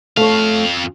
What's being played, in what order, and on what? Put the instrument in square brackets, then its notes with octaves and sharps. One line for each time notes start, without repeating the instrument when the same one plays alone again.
[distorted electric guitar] F2 F5 [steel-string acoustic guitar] A3 C#5